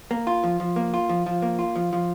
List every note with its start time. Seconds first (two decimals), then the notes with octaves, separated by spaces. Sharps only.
0.11 A#3
0.27 F4
0.44 F3
0.60 F3
0.76 A#3
0.94 F4
1.09 F3
1.26 F3
1.42 A#3
1.59 F4
1.76 F3
1.93 F3